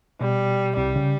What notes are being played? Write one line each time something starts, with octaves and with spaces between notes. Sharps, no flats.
B2 G3
C2 C3 G3
C#3